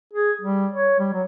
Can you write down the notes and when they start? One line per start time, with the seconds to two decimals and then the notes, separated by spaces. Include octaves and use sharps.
0.14 G#4
0.41 G3
0.72 C#5
0.99 G3
1.13 F#3